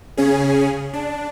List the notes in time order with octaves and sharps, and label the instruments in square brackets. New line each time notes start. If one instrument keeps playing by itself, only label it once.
[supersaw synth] C#3 C#4 G#4
D4